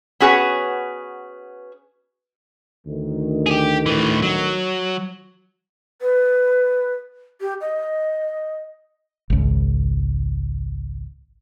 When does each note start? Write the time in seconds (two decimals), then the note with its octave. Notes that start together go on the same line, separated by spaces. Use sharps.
0.20 B3 C#4 F#4 G#4 B4 C#5
2.86 D2 D#3
3.46 G4 G#4
3.86 A2 E3
4.22 F#3
6.01 B4
7.41 G4
7.61 D#5
9.30 G#1 C#2